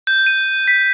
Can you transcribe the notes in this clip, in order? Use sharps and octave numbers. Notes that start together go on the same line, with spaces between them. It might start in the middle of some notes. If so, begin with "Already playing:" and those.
G6
D#7
B6